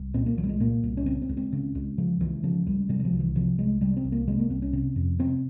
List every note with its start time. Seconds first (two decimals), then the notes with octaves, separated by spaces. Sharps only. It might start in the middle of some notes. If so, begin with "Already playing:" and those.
Already playing: C2
0.14 A#2 C4
0.26 A#3
0.38 C2 F3
0.43 G3
0.49 G#3
0.60 A#2 A#3
0.83 C2
0.97 C#4
1.06 C#3 C4
1.22 C4
1.29 C#2
1.37 C4
1.52 C#3
1.75 C#2
1.98 C#3 F3
2.21 C#2 E3
2.43 C#3 F3
2.67 C#2 G3
2.89 C3 G3
2.99 G3
3.05 F3
3.13 C2
3.20 E3
3.35 C3 F3
3.58 C2 G#3
3.81 C3 G3
3.97 C4
4.04 C2
4.12 A#3
4.27 C3 G#3
4.39 A#3
4.50 C2 C4
4.62 C#4
4.73 C3
4.96 F2
5.19 C3 C4